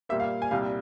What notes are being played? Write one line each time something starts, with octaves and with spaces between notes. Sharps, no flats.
A#2 G3 A#3 E5
F5
G#5
C2 A#2 G3 F5